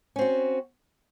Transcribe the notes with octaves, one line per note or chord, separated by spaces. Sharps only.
C4 C#4 F#4